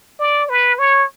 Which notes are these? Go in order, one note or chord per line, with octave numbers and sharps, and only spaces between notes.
D5
B4
C#5